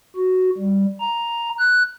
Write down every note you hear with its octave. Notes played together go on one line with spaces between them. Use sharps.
F#4
G3
A#5
F#6